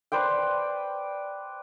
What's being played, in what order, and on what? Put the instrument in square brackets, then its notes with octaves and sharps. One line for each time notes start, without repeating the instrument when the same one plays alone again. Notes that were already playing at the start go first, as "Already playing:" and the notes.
[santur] B4 C5 D5 G5